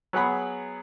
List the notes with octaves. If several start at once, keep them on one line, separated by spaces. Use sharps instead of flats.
F#3 B3 G#4 F#5 B5